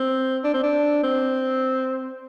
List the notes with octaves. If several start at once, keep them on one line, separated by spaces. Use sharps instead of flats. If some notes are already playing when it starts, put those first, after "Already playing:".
Already playing: C4
D4
C4
D4
C4